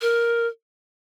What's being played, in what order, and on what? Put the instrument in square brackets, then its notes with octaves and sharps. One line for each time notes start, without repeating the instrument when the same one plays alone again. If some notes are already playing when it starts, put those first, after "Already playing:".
[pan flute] A#4